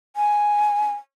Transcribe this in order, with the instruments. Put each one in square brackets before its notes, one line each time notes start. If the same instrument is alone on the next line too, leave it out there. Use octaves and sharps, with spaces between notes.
[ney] G#5